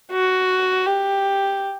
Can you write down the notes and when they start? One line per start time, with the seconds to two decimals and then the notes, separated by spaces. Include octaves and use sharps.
0.12 F#4
0.86 G4